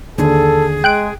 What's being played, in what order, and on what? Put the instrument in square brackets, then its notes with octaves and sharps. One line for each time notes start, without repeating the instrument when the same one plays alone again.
[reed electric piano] D#2 D3 [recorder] G#4 [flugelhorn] A4
[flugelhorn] G#3 [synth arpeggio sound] G5 F#6 D7